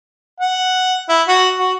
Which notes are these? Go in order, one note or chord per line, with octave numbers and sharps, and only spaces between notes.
F#5
E4
F#4
F#4